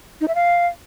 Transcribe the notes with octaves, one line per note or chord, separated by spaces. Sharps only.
D#4
E5
F5